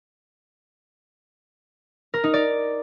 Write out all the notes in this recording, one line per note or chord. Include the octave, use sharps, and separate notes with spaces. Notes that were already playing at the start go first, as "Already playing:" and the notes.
A#4
D#4
D5